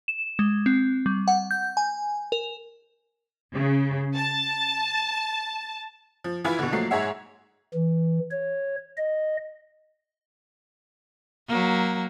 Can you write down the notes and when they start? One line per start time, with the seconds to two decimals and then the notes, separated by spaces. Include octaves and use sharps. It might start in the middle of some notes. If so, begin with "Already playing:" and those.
0.08 E7
0.39 G#3
0.66 C4
1.06 G3
1.28 F#5
1.51 G6
1.77 G#5
2.32 A#4
3.54 C#3
4.15 A5
6.24 F3
6.44 E3 E4 F4 B4
6.59 B2 D3
6.72 F3 F#3 A3 A#3 C7
6.91 G#2 G#4 C#5 E5 F#5
7.74 E3
8.31 C#5
8.97 D#5
11.48 F#3 A#3